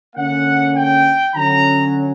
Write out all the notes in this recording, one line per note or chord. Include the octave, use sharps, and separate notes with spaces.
D3 A#3 C#4 F#5
G5
D3 F#3 C#4 A#5